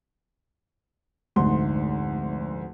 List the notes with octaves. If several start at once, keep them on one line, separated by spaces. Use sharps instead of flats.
F1 D2 G#2 C6